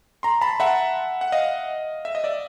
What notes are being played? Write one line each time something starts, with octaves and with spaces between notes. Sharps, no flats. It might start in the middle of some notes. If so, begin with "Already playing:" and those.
A#5 C6
A5 B5
E5 F#5
F#5
D#5 F5
E5
D#5
D5 E5